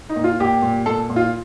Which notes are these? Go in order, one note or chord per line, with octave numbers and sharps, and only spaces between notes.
D#4
A#2
F4
A#2 G4
A#2
A#2 A4
A#2
F4